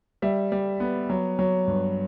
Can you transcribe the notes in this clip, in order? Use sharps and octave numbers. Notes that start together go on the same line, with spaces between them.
G3 E5
G3
B3
F#3
F#3
G2